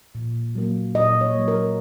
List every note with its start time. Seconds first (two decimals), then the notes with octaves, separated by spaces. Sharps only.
0.15 A#2
0.55 F#3 A#3
0.94 A#2 D#5
1.21 C#5
1.34 F#3 A#3
1.48 A#4